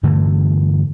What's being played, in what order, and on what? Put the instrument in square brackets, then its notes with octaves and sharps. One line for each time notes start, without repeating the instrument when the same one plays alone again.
[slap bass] G2 D3 E3 A3